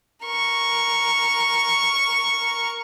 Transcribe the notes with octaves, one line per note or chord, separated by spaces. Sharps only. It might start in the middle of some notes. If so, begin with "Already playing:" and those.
A#4 C#6